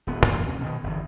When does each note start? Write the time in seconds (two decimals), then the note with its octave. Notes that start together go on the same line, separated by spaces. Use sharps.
0.07 D#1 B3
0.24 F#2 E3 A#3
0.45 D#2 C3 C#4
0.61 B2 D#3
0.84 G1 E2